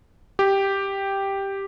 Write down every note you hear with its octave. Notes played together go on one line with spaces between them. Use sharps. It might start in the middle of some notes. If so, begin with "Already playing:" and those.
G4